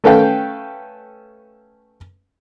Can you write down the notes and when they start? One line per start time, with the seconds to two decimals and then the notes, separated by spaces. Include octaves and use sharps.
0.04 A3 C#4 A4 B4 F5 G5